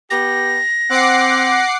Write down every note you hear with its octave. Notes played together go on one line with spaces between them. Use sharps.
B3 G4 A#6
C4 F#5 D6 C7